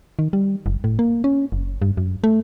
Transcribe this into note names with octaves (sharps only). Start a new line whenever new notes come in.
D#3
G3
F#1
A2
A#3
C#4
F#1
G2
F#2
A3